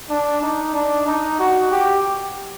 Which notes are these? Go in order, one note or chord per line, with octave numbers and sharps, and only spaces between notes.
D4
D#4
D4
D#4
F#4
G4